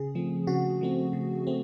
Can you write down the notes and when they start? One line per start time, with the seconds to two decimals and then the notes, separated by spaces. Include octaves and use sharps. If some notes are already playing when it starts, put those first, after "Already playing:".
Already playing: C#3 G#4
0.15 F3 A3 C4
0.47 C#3 F#4
0.81 F3 A3 C4
1.13 C#3
1.47 A3 C4